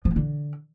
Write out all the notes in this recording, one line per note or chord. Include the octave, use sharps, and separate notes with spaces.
F3
A#3
D3